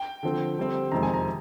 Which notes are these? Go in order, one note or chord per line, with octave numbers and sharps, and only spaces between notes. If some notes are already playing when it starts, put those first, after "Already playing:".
Already playing: G5
D3 F3 C4
D3 G3 C4
F2 C3 D#3 G#3 C4 A#5
G#5
A#5